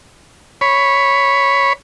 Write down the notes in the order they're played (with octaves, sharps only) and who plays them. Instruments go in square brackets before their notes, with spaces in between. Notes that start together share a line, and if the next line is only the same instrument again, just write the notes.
[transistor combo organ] C#5 B5